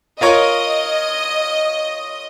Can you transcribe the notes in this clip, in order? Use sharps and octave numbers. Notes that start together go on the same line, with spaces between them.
F4 A#4 C#5 D#5